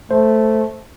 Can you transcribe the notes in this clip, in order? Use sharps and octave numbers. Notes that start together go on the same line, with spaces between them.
A3 C5